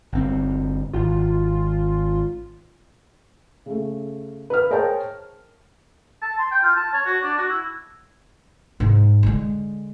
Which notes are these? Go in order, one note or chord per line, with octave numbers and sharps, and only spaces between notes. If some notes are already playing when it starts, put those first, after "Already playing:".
G1 C4
G#1 F4
C#3 A3
B4 F6
G#4 A#4 C5 C#5 G5 A5
A5
C6
G5
F4
A5
C#5
F#4
D4
F#4
E4
G#2
D3 G#3